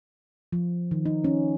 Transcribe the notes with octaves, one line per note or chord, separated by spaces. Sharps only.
F3
D#3
D#4
C#4